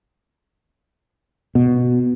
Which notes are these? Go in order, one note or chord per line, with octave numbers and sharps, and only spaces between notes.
B2